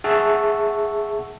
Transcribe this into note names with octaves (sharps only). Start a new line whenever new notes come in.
G#4 E5 F#5 A5 C#6 E6